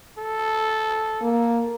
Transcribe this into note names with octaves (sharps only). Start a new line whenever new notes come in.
A4
A#3